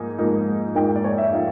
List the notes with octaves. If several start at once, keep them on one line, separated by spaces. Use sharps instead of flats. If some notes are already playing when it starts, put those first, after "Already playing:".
Already playing: G#2 F3 A#3 D#4 G#5
G#2 F3 A#3 D#4
G#2 F3 A#3 D#4 G5
D5
C#5
E5
F3 A#3 D#4 F5